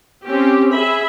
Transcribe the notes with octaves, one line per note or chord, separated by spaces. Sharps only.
C4 C#4 G4
G#4 E5 B5